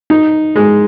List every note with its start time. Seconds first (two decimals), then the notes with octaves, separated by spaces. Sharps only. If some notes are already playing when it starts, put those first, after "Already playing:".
0.10 D#4
0.56 G#3